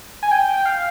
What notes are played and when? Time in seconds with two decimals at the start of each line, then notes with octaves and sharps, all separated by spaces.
0.23 G#5
0.31 G5
0.54 G5
0.66 F5